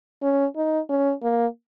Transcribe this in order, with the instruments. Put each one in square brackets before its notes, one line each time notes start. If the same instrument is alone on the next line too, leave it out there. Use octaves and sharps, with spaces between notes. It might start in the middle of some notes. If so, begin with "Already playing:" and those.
[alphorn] C#4
D#4
C#4
A#3